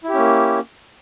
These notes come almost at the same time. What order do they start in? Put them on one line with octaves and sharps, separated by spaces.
E4 G4 C#4 A#3